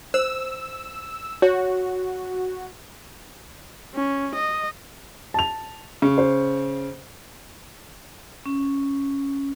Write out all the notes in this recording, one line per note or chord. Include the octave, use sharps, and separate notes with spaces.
C5 E6
F#4 C#5
C#4
D#5
A5 F7
C#3
C5
C#4